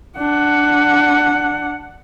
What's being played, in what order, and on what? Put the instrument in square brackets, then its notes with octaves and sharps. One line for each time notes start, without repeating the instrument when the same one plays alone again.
[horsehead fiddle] D4 F#5